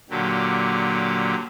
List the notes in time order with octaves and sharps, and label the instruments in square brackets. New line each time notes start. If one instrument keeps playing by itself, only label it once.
[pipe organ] A#2 D3 F#3 G4